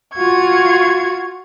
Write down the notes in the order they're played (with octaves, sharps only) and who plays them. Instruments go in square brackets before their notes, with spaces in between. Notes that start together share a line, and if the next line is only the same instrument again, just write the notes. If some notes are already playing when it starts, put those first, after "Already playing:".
[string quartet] F4 F#4 C#6 G#6